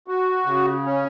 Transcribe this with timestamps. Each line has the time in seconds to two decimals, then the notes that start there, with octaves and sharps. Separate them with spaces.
0.08 F#4
0.46 C#3
0.85 C#4